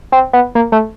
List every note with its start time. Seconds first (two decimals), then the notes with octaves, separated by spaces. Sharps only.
0.12 C4
0.33 B3
0.55 A#3
0.72 A3